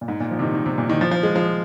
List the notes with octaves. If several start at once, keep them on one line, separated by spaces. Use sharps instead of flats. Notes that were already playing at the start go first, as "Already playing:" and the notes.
A#2
G#2
A#2
F3
C3
D#3
D#3
C3
A#2
D#3
F3
F3
G#3
F3